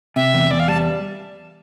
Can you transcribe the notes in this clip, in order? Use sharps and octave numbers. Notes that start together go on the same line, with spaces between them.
C3 E5
E2
E2 D5
F5
G3 A5